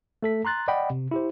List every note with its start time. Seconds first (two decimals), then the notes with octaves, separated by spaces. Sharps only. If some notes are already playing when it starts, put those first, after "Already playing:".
0.23 A3 A4 B6
0.45 A#5 C6 F#6 A6
0.68 D5 D#5 F#5 G5 B5
0.90 C3
1.11 E4 G4 C5